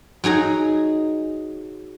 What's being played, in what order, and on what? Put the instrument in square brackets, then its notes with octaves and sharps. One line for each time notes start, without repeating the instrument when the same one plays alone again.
[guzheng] F#3 D#4 G#4 A#5